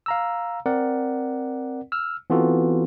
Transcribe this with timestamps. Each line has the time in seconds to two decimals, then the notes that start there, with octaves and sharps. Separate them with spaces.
0.06 F5 A#5 E6
0.66 C4 A#4 D5 F#5
1.92 E6 F6
2.30 E3 B3 C4 F4 F#4 A4